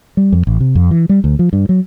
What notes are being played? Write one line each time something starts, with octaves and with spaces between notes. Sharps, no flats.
G3
F2
A1
C3
F2
E3
G3
D2
F3
G2
F#3